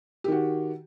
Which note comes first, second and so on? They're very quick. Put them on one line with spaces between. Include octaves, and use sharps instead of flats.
G4 D#3 F#4